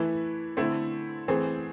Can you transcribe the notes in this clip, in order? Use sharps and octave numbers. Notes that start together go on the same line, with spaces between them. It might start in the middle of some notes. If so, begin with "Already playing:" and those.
Already playing: E3 A3 E4 B4
D3 A3 C4 E4 A4
E3 A3 C4 G#4 C5